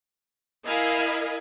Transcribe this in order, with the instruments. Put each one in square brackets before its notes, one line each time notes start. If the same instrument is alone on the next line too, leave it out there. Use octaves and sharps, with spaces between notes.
[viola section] E4 A#4 D#5 F5 G#5 B5